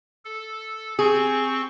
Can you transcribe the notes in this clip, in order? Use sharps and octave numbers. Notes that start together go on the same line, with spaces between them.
A4
C4 G#4 C#6